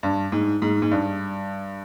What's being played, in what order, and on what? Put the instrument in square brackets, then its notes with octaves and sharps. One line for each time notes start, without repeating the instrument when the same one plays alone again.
[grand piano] G2
G#2
G#2
G#2
G2